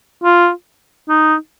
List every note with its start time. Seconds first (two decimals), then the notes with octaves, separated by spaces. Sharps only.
0.24 F4
1.09 D#4